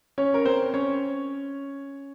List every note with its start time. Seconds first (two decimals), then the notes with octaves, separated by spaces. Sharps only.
0.18 C#4 C#5
0.34 A#4
0.45 C4 C5
0.74 C#4 C#5